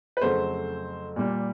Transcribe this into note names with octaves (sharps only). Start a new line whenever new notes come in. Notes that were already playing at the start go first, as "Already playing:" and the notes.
B4
F2 C#3 F#3 A3 C5
A#2 G3